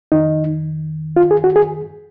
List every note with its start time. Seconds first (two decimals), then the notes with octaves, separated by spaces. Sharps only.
0.12 F2 D#3 D#4
1.16 F4
1.31 G#4
1.44 F#4
1.56 G#4